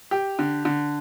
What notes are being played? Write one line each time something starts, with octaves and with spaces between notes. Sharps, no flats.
G4
D3
D3